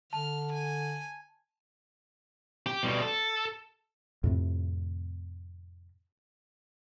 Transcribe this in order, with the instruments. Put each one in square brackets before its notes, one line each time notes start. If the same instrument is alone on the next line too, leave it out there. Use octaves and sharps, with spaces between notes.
[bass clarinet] D3 [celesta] A5 [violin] F6
[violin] G#5
[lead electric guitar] G4
B2 G3
A4
[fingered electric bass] F2 A2 C3